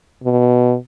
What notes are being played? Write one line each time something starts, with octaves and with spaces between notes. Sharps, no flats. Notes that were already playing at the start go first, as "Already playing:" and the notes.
B2